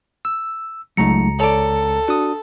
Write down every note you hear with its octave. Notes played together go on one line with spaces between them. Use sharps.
E6
C#2 F#3 A3 D#4 A#5 C#7
A4 C#5 D5
D4 F#4 D#6